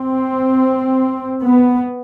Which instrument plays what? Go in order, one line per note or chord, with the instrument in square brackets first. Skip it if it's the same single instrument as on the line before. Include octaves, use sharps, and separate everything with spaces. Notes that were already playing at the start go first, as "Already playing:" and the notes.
Already playing: [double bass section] C4
B3